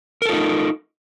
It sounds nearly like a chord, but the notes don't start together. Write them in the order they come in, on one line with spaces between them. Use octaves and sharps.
A#4 A4 F4 D#4